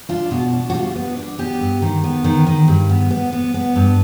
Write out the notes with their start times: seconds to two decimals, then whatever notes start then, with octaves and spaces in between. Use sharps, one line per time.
0.09 D4 F4
0.31 B2
0.53 D4
0.70 F#4
0.74 G3 F4
0.95 B3
1.17 D4
1.38 B3 G4
1.60 G2
1.82 D#3
2.04 B3
2.24 D#3
2.47 D#3
2.68 G2
2.89 B3
3.11 B3
3.32 B3
3.54 B3
3.76 G2